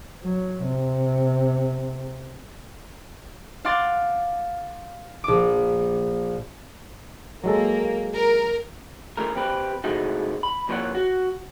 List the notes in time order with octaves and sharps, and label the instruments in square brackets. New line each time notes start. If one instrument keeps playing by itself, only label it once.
[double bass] F#3
C3
[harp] F5 F#5 C6 D6 A6
A#1 D6
[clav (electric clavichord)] F#3 G#3 A4 [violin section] A#3
[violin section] A#4
[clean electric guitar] B1 E2 E3 A3 A#4
C4 G4 B4
A2 C3 G#3 A3 D#4 F#4
B5
F2 A#2 E3 C5 C#5 F#5
F#4